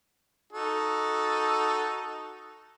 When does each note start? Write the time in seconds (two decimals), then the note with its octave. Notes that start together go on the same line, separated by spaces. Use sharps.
0.53 D#4 F#4 A4